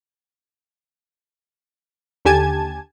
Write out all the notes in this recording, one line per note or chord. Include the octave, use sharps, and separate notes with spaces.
D#2 D3 G4 G#5 A5 G#6